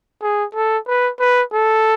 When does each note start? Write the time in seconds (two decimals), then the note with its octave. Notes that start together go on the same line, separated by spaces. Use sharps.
0.22 G#4
0.55 A4
0.88 B4
1.19 B4
1.53 A4